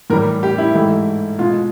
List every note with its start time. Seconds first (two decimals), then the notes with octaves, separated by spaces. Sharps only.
0.10 A2 E3 G3 A#4
0.43 G4
0.58 E4
0.74 G#2 E3 A3
1.39 B2 G#3 F4